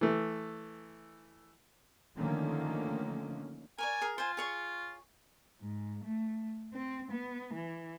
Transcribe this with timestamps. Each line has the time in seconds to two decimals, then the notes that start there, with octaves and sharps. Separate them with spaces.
0.01 E3 A3
2.16 D3 D#3 F3 A3 A#3 C#4
3.78 A#4 C#5 D5 G#5
4.01 G#4 A#4
4.18 F4 C5 G#5
4.37 G#4 C#5 C#6
5.61 G#2
6.05 A3
6.74 C4
7.11 B3
7.54 E3